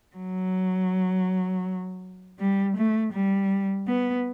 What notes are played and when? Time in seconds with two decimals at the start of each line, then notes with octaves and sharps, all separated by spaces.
0.16 F#3
2.40 G3
2.77 A3
3.13 G3
3.88 B3